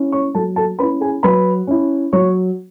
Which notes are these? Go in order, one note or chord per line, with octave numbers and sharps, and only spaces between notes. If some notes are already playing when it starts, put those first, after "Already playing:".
Already playing: C#4 E4
C#5 C#6
F#3 A4 A5
A4 A5
C#4 E4 B4 B5
G#4 G#5
F#3 B4 B5
C#4 E4
F#3 C#5 C#6